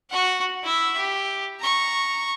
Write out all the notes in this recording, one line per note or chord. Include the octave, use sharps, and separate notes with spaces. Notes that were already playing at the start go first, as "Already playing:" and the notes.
F#4 F#5
E4 E5
G4
A#5 C#6